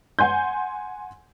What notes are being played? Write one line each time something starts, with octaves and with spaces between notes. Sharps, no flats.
F#5 G#5 C6 G6